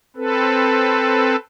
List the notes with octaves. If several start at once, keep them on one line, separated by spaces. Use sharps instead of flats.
C4 A4 B4